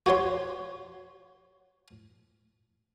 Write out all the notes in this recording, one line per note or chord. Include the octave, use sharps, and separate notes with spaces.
F#4 G4 C#5 C6